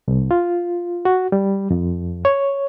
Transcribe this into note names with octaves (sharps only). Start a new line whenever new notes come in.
C2
F4
F#4
G3
F2
C#5